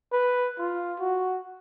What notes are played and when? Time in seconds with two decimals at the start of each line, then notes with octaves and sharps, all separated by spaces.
0.12 B4
0.59 F4
1.00 F#4